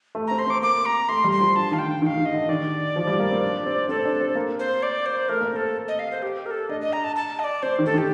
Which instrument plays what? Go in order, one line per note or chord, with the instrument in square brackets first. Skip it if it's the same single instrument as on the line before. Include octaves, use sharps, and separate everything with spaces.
[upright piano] A3
[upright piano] C4 [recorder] A#5
[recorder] C6
[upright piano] C4 [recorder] D6
[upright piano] A#3 [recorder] D6
[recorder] A#5
[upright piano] A3 [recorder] C6
[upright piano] G3
[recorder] C6
[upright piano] F3
[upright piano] D3 [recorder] A5
[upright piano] D#3 [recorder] F5
[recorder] G5
[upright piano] D3
[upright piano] D#3 [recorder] G5
[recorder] F5
[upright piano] D#3
[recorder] D#5
[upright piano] D3
[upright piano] D#3 [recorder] D5
[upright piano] F3
G3
A#3
C4
D4
C4
[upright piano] C4 [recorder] A4
[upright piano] D4
C4
A#3
[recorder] C5
D5
C5
[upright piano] A3 [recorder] A#4
[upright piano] A#3
[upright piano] C4 [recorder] A#4
[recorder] A4
D#5
F5
C5
G4
A#4
A4
[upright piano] D4 [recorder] D#5
[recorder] D#5
A#5
A5
A5
D#5
D5
[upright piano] C4 [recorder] C5
[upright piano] D#3
[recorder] A4
[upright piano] D#3 [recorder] G4